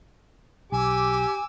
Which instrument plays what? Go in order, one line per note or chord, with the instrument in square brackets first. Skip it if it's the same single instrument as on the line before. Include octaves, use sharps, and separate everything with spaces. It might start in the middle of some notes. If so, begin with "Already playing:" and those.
[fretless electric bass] B1 [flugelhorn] G4 [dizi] G#5 [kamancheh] D6 E6